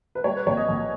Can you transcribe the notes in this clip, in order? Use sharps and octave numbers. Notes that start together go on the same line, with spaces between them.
B4
G3 C#5
B4
A#1 C#5
D#5
A#1